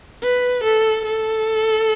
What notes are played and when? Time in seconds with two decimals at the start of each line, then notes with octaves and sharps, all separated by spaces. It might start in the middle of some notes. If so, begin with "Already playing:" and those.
0.23 B4
0.64 A4
1.06 A4